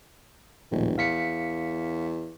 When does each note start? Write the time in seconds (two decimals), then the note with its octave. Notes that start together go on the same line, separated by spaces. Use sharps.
0.72 E1 A#1 D#2 A2
0.98 E2 F5 B6 C#7